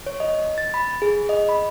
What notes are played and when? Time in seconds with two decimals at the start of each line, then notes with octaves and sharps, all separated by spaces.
0.06 C#5
0.20 D#5
0.58 A6
0.74 B5
1.02 G#4
1.29 D#5
1.49 B5